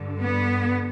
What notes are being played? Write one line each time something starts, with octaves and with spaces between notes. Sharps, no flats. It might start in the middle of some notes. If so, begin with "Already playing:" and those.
Already playing: G2 D3
B3